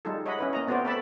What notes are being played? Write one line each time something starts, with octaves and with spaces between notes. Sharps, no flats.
G3 G#3 D#4 F4 A4
C#5 D#5 E5 F#5 B5
C#4 E4 B4
A#3 D#5 A#5
A3 B3 C4 F#4 C5 D5
A4 B4 D5 E5 A5 B5